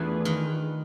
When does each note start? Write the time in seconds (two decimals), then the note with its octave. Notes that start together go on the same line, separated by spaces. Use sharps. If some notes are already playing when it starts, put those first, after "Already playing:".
Already playing: E2 E3 A3 D4 F4 G#4 B4
0.25 D#3